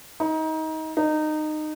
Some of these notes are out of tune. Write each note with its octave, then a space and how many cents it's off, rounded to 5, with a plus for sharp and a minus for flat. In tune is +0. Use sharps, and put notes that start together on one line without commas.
D#4 +25
D#4 -20